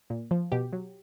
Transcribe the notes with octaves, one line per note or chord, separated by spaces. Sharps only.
A#2
F3
B2 G4
F#3